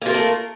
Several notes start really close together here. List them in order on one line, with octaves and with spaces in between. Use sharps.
A#3 F4 A#4 A3